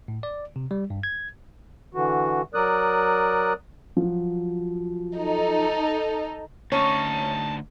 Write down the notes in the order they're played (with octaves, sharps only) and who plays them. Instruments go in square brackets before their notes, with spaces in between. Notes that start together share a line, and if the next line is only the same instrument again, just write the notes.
[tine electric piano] A2
D5
C3
G3
G2
G#6
[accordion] D3 E3 F#4
F#3 A#4 D5 D#6 F#6
[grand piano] F3 F#3 F#4
[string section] D#4 A4
[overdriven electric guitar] D2 D#4 [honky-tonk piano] C#4 [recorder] A5 [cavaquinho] C#6